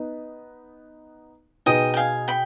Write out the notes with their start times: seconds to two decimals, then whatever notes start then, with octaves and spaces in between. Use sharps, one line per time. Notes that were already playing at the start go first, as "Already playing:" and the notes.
Already playing: B3 D#4 B4
1.66 B2 B3 D#4 G#4 D#5 G5
1.94 G5
1.97 F5 G#5
2.28 G5 B5